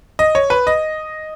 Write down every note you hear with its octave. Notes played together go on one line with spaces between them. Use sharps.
D#5
C#5
B4
D#5